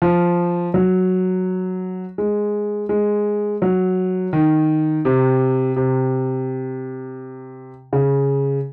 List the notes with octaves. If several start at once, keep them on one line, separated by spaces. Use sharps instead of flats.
F3
F#3
G#3
G#3
F#3
D#3
C3
C3
C#3